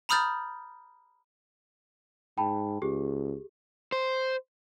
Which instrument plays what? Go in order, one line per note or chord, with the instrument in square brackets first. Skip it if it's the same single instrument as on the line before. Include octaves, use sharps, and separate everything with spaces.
[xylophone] A#5 B5 D#6 F6 G6 A6
[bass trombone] G#2 [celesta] G5 A5 B5
[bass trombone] C#2 [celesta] G4 G#4
[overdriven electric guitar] C5